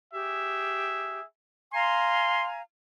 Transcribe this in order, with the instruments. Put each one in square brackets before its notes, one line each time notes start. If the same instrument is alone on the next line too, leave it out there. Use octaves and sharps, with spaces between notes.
[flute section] G4 [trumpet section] G#4 E5
[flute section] F5 G#5 A#5 [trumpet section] C6